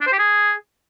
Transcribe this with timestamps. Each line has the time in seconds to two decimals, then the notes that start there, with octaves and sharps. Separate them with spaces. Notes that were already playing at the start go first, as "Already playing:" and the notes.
0.01 D4
0.07 C5
0.13 G4
0.19 G#4